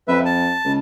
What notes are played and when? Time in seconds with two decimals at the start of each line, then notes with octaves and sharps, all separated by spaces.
0.08 F2 B4 E5
0.25 A5
0.64 C#2